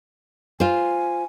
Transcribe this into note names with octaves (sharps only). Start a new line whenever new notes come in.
F4 C5 G#5